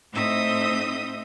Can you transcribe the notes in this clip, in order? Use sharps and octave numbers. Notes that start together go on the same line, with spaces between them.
A2 C4 D#4 E5 D#6 G6